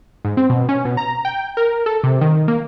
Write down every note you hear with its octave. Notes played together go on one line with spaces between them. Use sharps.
G#2
C4
B2
C#4
B2
A#5
G5
A#4
A4
C3
D#3
A#3